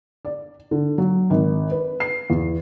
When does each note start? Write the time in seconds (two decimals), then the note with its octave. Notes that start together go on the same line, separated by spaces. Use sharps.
0.25 D5
0.71 D3
0.98 F#3
1.30 G#1
1.71 B4
2.00 C7
2.30 E2